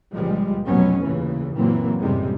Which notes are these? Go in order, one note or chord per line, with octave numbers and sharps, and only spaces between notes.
C#2 A#2 F3 G3 G#3
F1 F2 B2 F#3 B3 C#4
D#2 A#2 C#3 E3
F#1 A#2 E3 F#3 A#3 C4
F#1 B1 A2 C3 G3 G#3